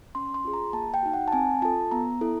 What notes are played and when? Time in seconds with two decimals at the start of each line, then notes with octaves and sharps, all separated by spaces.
0.15 C#4 C6
0.34 C6
0.45 F4 G#4
0.53 A#5
0.73 A#3 A5
0.94 G5
1.03 D#4 F#4
1.14 F#5
1.28 A5
1.33 C4 G#5
1.62 F4 A4 A5
1.91 B3 A#5
2.21 E4 A4